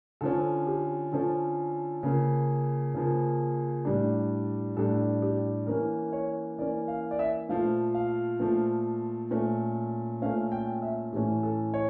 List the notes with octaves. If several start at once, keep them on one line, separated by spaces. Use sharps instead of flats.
D3 F3 C#4 A4
G4
D3 F3 C#4 A4
C#3 F3 A#3
C#3 F3 A#3
A2 G3 D4
A2 G3 D4 A4
G4
E3 A#3 C#4 A#4
C#5
E3 A#3 C#4 D5
F5
D5
E5
A#2 F3 A3 F5
F5
A#2 F3 A3
A#2 A3 C#4
A#2 A3 C#4 F5
G5
E5
A2 E3 A3 C#4 G4
A4
C#5